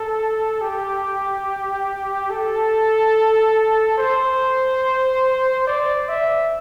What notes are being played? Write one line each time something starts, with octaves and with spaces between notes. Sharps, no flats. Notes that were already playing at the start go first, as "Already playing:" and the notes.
Already playing: A4
G4
A4
C5
D5
E5